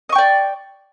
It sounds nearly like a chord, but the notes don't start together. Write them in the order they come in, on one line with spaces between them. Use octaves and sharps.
D#5 C#6 G5 D5